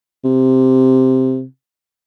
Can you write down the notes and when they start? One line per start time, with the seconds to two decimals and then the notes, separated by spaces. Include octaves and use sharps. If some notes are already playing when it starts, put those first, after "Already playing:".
0.25 C3